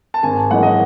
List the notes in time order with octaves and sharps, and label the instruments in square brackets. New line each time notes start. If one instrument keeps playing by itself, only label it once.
[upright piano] A5
G#1 G#5
F#2 E3 G#3 F#5
D#5